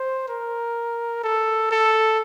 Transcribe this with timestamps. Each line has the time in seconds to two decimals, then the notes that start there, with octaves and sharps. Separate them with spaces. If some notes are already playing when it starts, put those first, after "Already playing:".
Already playing: C5
0.28 A#4
1.24 A4
1.71 A4